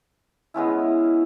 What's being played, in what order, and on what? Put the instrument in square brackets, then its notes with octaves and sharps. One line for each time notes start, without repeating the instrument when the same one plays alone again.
[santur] G#3 B3 C#4 E4